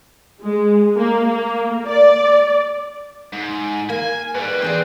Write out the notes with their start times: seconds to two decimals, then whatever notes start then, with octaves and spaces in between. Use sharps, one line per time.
0.42 G#3
0.97 A#3
1.29 A#3
1.87 D5
3.33 G#2
3.90 A#3 G#5
4.35 G#2 G3 B4
4.62 E2 C4 G#4 C5 D5